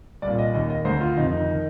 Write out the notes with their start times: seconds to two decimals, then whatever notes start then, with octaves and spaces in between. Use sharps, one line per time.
0.22 C2 D5
0.27 A#2
0.39 D#5
0.54 D#2 D#3 D#5
0.70 D#5
0.85 D2 D3 C5
1.00 F4
1.17 F2 C3 D#3 D#4
1.27 D#4
1.37 D#4
1.52 D#3